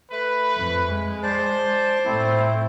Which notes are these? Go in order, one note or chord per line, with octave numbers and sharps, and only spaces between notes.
A3 B4
F2
G#3
C5 D5 A5
A2 A3 C4 E4